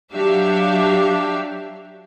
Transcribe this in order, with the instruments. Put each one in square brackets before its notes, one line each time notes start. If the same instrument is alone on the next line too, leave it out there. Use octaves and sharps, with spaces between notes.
[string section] F#3 D4 G4 E5 F5